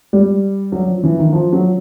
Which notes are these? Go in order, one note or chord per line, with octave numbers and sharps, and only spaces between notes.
G3
F#3
F3
E3
D#3
F3
F#3